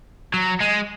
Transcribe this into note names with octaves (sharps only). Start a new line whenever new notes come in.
F#3
G#3